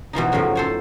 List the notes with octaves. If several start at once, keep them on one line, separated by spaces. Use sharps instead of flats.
B2 E3 F3 D#4
F#2 A2 C#3 F3 F#3
A4 C5 C#5